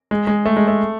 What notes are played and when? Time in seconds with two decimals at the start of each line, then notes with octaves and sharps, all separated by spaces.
0.11 G#3
0.27 G#3
0.45 A3
0.57 G#3
0.68 A3